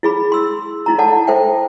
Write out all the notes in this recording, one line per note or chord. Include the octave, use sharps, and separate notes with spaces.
E4 G#4 B5
C6 E6
D#4 E4 A#5
A4 D5 F#5 A5
A4 C5 E5 G5